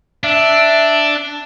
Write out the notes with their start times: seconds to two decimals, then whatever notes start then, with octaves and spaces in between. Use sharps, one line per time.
0.24 D4 E5